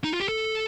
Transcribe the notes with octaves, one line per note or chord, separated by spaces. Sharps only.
D#4
F4
G4
A4